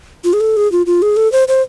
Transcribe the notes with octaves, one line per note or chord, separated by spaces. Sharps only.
F4
G#4
A4
G#4
F4
F4
G#4
A4
C5
C5